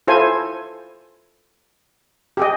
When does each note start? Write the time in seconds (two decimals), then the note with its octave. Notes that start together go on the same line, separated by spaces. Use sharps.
0.07 E4 F4 A4 C5 G#5
2.37 G4 G#4 D#5